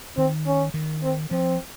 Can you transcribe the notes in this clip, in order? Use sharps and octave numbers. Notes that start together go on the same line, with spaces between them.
D#3 C4
C#4
D#3
C4
F3 C4